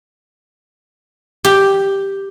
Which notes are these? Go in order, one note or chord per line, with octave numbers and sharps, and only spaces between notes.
G4